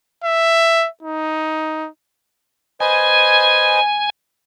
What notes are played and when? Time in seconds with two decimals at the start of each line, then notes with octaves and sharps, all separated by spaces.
0.24 E5
1.03 D#4
2.80 B4 C5 D#5 G#5